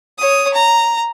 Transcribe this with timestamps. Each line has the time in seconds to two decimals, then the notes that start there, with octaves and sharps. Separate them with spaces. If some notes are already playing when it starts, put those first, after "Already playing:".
0.18 C#5 D#6
0.54 A#5